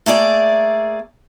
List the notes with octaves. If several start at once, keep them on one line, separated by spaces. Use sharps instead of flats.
A3 A#3 G#4 D5